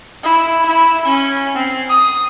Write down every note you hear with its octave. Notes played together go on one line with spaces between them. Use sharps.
E4
E4
C#4
C4
D#6